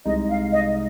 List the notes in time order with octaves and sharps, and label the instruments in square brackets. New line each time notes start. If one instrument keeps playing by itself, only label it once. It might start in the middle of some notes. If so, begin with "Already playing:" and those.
[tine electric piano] C2 C3 G#3 D#4 [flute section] D#5
[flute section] F5
D#5